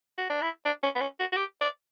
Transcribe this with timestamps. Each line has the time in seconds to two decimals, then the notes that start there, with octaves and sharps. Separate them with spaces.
0.18 F#4
0.30 D4
0.42 E4
0.66 D4
0.83 C#4
0.96 B3
1.01 C#4
1.20 F#4
1.32 F#4
1.37 G4
1.61 D5